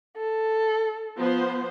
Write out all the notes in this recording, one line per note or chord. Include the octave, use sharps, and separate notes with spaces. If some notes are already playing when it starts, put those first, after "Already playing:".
A4
F3 B3 C5